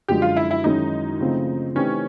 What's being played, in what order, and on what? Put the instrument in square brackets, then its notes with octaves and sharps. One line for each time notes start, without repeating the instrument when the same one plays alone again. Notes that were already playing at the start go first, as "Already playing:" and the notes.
[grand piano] F#2 D3 F3 G#3 [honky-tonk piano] G4
[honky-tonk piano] F4
E4
E4
[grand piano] F#2 D#3 G#3 C#4 E4 [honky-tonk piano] D#4
[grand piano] C#3 F3 A3 C4 F4
[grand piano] E3 A3 C4 D#4 G4 [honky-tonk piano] C#4